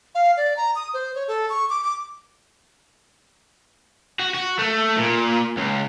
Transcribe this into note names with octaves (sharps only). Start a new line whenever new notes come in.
F5
D5
A#5
D#6
C5
C#5
A4
C#6
D6
D6
F#4
F#4
A3
A#2
C#2